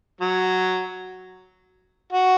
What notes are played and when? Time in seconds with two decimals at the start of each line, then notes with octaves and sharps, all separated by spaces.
0.21 F#3
2.12 F#4